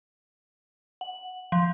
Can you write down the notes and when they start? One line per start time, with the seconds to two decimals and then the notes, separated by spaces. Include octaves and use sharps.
1.01 F#5
1.52 F3